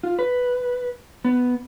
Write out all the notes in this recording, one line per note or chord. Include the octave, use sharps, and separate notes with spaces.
F4
B4
B3